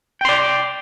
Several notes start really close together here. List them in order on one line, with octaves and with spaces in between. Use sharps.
G5 C6 D5